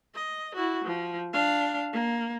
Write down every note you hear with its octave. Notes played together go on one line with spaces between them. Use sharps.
D#5
E4 F#4
F3
D4 F5
A#3